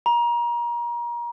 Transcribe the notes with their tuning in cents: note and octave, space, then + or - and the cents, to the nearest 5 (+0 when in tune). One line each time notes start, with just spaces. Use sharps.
A#5 +30